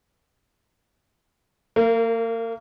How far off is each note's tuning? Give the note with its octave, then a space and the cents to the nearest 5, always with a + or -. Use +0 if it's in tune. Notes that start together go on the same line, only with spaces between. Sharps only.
A#3 -35 A#4 +0